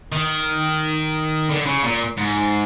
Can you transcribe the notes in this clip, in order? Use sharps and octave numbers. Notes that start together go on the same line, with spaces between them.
D#3
D3
C#3
A#2
G#2